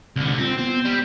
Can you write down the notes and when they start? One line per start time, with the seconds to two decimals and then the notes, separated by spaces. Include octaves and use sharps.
0.16 C2 D3
0.38 C4 F4
0.58 B3 C4
0.85 G3 G4